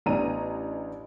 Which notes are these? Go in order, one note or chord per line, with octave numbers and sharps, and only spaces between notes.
A1 B3 D4 A#5 D#7